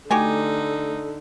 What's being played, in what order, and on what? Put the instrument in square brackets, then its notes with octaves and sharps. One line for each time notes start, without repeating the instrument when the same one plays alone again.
[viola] D3 [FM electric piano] A3 [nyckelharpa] D#4 [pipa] F#4 G4 G#5